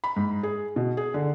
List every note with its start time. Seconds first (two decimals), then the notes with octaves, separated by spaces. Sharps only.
0.04 B5
0.16 G#2
0.43 G#4
0.76 B2
0.97 G#4
1.14 D3